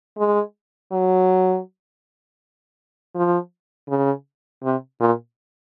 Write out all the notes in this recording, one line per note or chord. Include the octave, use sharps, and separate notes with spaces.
G#3
F#3
F3
C#3
C3
A#2